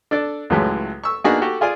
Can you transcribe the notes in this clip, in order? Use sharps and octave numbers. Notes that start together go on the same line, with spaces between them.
D4 A4 D5
C#2 A2 E3 F#3 G#3 A3
C#6 E6
A#3 B3 D4 D#4 F#4 G#4
F#4 G4 A4
F4 G#4 D5 G#5